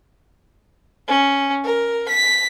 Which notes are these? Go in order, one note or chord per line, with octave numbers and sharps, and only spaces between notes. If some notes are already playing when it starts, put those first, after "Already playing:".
C#4
A#4
B6